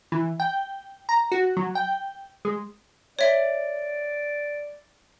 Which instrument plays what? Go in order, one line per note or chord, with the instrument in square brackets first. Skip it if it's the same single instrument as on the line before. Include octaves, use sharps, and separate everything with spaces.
[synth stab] E3
G5
A#5
F#4
F#3
G5
G#3
[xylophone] C#5 E5 [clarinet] D5